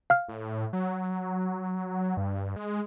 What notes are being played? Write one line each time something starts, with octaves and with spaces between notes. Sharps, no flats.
F5 F6
A2
F#3
G2
G#3